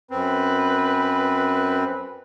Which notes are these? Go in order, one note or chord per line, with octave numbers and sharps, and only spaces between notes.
F#2 C4 B4